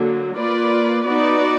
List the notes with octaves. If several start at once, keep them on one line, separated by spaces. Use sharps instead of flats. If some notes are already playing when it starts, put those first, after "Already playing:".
Already playing: D3 F#3 A#3
A#3 F4 B4 D5
B3 D#4 F#4 B4 D5